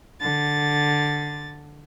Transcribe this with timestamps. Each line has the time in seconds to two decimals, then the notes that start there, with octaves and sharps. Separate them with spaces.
0.21 D3 A6